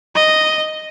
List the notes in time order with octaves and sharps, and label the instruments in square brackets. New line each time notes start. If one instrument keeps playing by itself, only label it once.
[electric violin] D#5